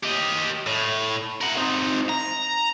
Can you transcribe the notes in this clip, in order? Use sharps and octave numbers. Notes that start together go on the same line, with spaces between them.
G4 D#5
A2
A#4 F#5
C4 D#4
A#5